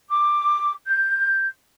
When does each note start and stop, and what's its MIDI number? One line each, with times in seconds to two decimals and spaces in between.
0.09 0.72 86
0.86 1.46 91